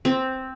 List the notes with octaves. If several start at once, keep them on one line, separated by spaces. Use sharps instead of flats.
C4